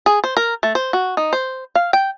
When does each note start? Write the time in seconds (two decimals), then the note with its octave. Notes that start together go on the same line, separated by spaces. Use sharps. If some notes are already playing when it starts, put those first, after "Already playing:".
0.06 G#4
0.24 C5
0.37 A#4
0.63 A3
0.75 C5
0.93 F#4
1.17 D#4
1.33 C5
1.75 F5
1.93 G5